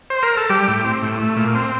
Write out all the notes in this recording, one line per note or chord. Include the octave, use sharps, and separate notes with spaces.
C5
A#4
A4
G3 G4
A2
C4
A2
A3
A#2
C4